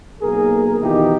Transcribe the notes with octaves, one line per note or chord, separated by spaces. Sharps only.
B1 A#3 G#4 A#4
B2 D#3 E3 D#4 F4 G4